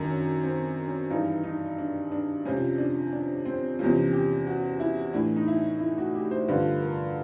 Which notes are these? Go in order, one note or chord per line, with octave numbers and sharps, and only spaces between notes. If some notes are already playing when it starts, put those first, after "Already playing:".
Already playing: F#2 D#3 D4
C#4
C4
C#4
G2 E3 D#4
D#4
D4
D4
F2 C3 F3 C#4
D4
D4
C4
E2 C3 F3 C#4
G4
F#4
E4
A2 E3 D4
D#4
E4
E4
F#4
G4
C5
G2 D3 F3 B4
A#4